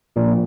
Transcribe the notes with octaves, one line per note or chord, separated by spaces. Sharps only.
A#1 A#2